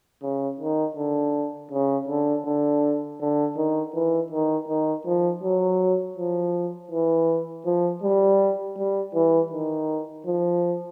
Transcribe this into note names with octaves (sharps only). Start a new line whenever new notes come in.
C#3
D#3
D3
C#3
D3
D3
D3
D#3
E3
D#3
D#3
F3
F#3
F3
E3
F3
G3
G3
E3
D#3
F3